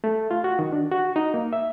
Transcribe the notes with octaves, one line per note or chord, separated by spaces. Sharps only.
A3
F4
F#4
D#3
D4
F#4
D#4
A#3
E5